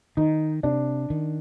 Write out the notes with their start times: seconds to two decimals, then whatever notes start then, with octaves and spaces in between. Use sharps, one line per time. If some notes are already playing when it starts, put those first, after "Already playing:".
0.17 D#3 D#4
0.63 C3 D4
1.10 D#3